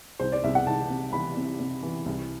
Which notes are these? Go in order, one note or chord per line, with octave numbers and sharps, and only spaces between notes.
C2 C5
D5
C2 E5
F#5
C2 A5
C3
E3 B5
C3
C3
E3
C2